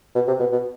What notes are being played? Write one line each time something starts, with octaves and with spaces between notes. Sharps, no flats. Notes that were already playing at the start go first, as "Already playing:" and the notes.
B2
C3
B2
B2